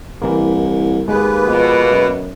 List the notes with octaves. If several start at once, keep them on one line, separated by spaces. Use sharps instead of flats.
C2 E3 A#3
D#2 G#3 A#3 B3 B4
B2 F3
F#2